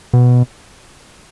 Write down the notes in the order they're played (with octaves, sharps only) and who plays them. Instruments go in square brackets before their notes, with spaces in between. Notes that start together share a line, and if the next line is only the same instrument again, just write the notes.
[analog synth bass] B2